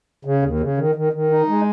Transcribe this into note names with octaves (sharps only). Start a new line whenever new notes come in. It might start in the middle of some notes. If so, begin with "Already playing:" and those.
C#3
D#2
C#3
D#3
D#3
D#3
D#4
G#3